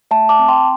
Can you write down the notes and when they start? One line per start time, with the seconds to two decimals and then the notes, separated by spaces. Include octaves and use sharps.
0.11 A3 E5 A5
0.29 A5 D6
0.39 C4
0.48 G5 C6